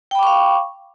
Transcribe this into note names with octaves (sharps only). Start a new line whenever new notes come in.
F5 G5 B5 C#6 D6